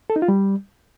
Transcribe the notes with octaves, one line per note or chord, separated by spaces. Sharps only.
A4
D#4
F4
G3